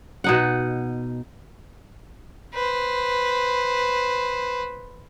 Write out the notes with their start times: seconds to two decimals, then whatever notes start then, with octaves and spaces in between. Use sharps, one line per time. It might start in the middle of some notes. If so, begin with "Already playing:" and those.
0.24 B2 D#4 F#5
2.54 B4 C5